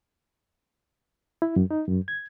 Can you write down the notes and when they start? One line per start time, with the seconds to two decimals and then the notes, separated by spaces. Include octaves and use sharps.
1.42 E4
1.56 F#2
1.71 D#4
1.87 F#2
2.08 G#6